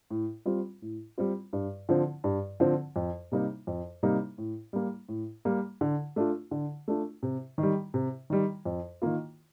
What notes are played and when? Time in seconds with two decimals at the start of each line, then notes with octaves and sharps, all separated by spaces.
0.11 A2
0.45 G3 C4 F4
0.82 A2
1.18 G3 C4 F4
1.53 G2
1.89 D3 F3 C4
2.24 G2
2.60 D3 F3 C4
2.96 F2
3.32 C3 G3 A#3 D#4
3.67 F2
4.03 C3 G3 A#3 D#4
4.38 A2
4.73 G3 A#3
5.09 A2
5.45 G3 A#3
5.81 D3
6.16 A3 D4 F4
6.51 D3
6.88 A3 D4 F4
7.23 C3
7.58 D#3 G3
7.94 C3
8.30 D#3 G3
8.65 F2
9.02 D#3 A#3 F4